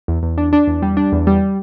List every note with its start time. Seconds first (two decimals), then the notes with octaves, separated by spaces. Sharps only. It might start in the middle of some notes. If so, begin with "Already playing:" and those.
0.08 E2
0.23 E2
0.38 D4
0.53 D4
0.68 E2
0.82 G3
0.97 D4
1.12 E2
1.27 G3